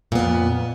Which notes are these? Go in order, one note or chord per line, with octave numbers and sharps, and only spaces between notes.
F2 A#2 B3